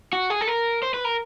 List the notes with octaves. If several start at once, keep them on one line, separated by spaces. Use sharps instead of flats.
F#4
G#4
A4
A#4
C5
B4
A#4